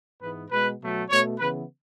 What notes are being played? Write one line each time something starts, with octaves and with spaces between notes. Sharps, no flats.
G#2 E3 G#3 B3 B4
B2 G#3 B3 B4
B2 F#3 A3
B2 A3 C#5
C#3 E3 B3 B4